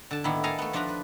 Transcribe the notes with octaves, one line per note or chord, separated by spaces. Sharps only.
D3 A5
A2 D#3 A#3 B3 E4
A4 A#4 D#5 F5 G#5 A#5
A3 B3
F3 D4 F4 B4 A#5
B4